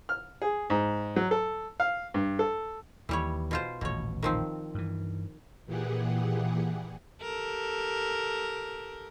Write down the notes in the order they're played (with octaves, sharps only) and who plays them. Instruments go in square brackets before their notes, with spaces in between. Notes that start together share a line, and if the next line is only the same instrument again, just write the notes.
[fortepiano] F6
G#4
G#2
F#3
A4
F5
G2
A4
[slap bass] D#2 D#3 [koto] E3 G3 C#5
[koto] B2 F4 C5
[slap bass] D#1 A1 [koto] B2 C#5
[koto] D#3 F3 C4
[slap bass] G2 E3
[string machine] A#2 E3 G4 G#4 F#5
[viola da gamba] G4 A4 A#4